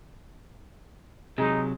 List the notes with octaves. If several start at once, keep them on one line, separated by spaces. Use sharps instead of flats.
C3 F#3 G#3 D#4